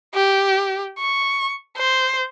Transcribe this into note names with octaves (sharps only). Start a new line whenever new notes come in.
G4
C#6
C5